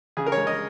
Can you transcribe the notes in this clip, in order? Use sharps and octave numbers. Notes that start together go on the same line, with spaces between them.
C#3 G#4
A#4
C#5
G#3
D#5